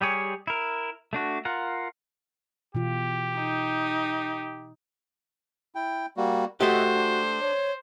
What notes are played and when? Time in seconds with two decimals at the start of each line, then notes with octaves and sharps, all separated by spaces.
0.01 G3 G4 G#4 C#5
0.47 E4 A#4
1.13 A3 D4 F#4
1.45 F4 A#4 F#5
2.75 B2 E3 F4 G4
3.35 D#4
5.75 E4 G5
6.17 G3 A#3 F#4
6.60 A3 F#4 G4 C5 D#5 E5 F#5
6.95 D4
7.41 C#5